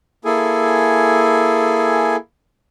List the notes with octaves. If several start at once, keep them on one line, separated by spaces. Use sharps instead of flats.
A#3 E4 G#4 A4 G#5